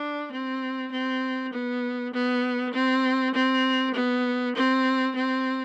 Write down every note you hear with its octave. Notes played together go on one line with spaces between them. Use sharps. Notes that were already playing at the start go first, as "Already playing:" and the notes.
Already playing: D4
C4
C4
B3
B3
C4
C4
B3
C4
C4